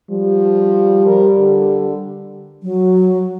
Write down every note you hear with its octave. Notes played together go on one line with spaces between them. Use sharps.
F3 G3
A#4
D3
F#3